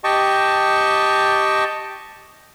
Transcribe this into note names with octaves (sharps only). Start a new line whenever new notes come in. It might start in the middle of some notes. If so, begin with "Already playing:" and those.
G4 D#5 G5 A5 C#6